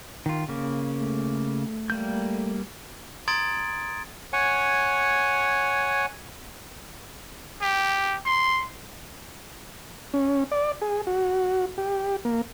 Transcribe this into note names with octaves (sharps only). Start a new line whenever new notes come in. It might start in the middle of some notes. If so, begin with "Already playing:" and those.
D#3 F4
C#3 A#3
A3
G3 A#3 G6
A#5 C6 D#6 G#6 A6 D7
C#5 F#5 G#5
G4
C6
C#4
D5
G#4
F#4
G4
A#3